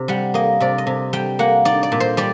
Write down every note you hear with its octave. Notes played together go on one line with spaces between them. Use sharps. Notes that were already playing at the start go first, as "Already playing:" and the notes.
Already playing: C3
G3 F#5
A#3 D#5
C3 D5
D#5
C3
G3 G5
A#3 F#5
D#4 D5
D5
A#2
C5
G3 D5